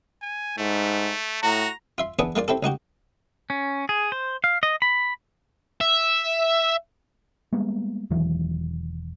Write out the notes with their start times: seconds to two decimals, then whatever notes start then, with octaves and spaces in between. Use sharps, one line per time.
0.22 G#5
0.57 G#2 A3
1.43 A2 F#4 A#5
1.98 F4 E5 C6
2.19 E3 B3 D4 G#4 B4
2.36 G#3 A#3 F4 D5
2.48 C4 E4 G4 A4
2.63 C#2 D#4 F#4 G4
3.50 C#4
3.89 G#4
4.12 C5
4.44 F5
4.63 D#5
4.82 B5
5.81 E5
7.53 G3 G#3 A#3 B3
8.10 E1 D#3 E3 F#3